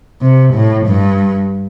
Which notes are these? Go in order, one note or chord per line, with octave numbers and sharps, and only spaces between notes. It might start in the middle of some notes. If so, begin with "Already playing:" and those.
C3
A2
G2